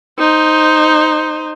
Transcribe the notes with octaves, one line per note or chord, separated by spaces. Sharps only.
D#4 C5